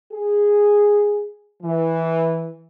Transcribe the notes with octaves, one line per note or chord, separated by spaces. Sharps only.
G#4
E3